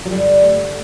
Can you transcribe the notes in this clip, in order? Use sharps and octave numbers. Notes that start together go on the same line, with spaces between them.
F#3
G2 D3 G3
A3